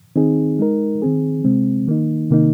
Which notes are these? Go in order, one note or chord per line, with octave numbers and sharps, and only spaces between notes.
D#3 C4 D#4 G#4
G#3 D#4 A#4
D#3 C4 G#4
C3 G#3 C4
D#3 A#3 D#4
C3 D#3 A#3 D#4